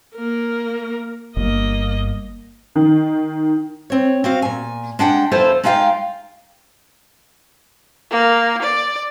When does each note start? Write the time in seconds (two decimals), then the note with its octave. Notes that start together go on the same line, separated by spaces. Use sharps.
0.15 A#3 A#4
1.37 G1 G2 A#3 D#5
2.75 D#3
3.90 C4 C#5
4.24 C4 F#4 F5
4.42 A#2 G#5
4.99 G#3 D4 F#5 G5
5.31 E2 E4 F4 A4 C5
5.64 G#3 D#4 F4 F5 G5
8.11 A#3
8.62 D5